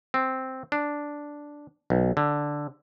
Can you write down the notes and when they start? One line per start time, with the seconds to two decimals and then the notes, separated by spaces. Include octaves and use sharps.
0.14 C4
0.72 D4
1.90 B1
2.17 D3